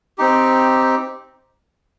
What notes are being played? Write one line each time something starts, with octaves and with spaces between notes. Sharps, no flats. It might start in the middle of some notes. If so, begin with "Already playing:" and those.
C4 D#4 G4